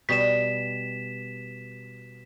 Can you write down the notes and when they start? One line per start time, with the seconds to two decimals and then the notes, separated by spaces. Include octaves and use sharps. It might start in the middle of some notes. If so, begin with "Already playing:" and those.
0.09 B2 G3 B6 E7